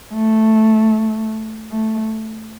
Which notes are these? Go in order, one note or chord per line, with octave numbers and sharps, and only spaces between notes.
A3
A3